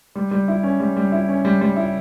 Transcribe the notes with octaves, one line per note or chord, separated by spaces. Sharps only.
G3
G3
E4
C#4
G3
G3
E4
C#4
G3
G3
E4